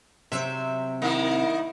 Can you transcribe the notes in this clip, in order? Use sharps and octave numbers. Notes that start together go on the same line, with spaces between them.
C3 F#3 C4 E5
D#3 A#3 E4